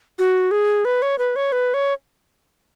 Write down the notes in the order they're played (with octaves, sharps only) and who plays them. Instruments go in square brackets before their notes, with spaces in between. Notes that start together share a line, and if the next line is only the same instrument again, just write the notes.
[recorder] F#4
G#4
B4
C#5
B4
C#5
B4
C#5